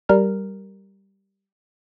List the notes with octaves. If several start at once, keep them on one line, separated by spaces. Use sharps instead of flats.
G3 A#4 F6